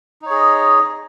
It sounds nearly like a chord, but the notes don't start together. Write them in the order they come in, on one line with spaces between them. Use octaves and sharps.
D#4 C#5 G#4 D#5